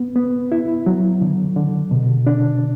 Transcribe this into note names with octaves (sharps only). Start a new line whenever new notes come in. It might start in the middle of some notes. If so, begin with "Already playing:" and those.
Already playing: B3
B3
E4
F#3
D3
D3
B2
D4